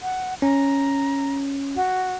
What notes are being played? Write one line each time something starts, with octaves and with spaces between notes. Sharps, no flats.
F#5
C#4 A#5
F#4